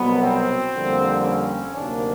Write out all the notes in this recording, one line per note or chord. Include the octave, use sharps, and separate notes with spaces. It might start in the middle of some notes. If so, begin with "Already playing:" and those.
Already playing: C2 B2 F#3 B3
C4
F2 D3 G3 A#3
C#4
D2 C3 D#3 F#3 A#3 D4